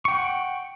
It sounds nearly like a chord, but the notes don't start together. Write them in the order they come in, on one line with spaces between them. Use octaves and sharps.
C#6 G5 F#5